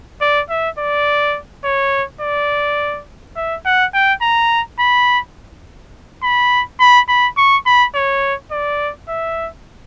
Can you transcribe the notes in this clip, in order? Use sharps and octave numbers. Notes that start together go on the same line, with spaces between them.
D5
E5
D5
C#5
D5
E5
F#5
G5
A#5
B5
B5
B5
B5
C#6
B5
C#5
D5
E5